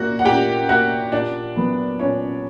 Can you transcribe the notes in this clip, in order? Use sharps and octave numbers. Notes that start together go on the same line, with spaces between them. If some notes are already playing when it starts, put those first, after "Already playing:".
Already playing: A#2 A#3 F#4 F#5
F#5
A#2 G4 G5
A#3 F#4 F#5
A#2 D4 D5
F#3 B3
A#2 C#4 C#5